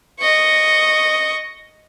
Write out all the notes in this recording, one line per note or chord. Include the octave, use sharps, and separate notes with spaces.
D#5 C#6